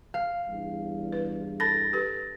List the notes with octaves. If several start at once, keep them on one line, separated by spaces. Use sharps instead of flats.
F5
E2 G2
B4
A4 A5 B5 A6 A#6
G4 A4 B4